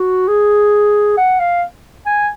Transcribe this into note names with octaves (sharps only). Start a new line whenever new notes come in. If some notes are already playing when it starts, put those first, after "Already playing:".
Already playing: F#4
G#4
F#5
F5
G#5